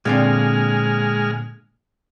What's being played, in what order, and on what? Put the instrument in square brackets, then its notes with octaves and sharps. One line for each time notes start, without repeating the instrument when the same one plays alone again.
[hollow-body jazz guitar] A#2 D3 C4 [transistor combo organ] G#3 F6